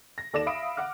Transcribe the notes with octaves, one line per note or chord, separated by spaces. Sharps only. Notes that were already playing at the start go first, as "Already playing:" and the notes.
A#6
D#2 A4 D5 D6 A#6 E7
E5 F5 B5 D#6 D7
F#5 D6 F6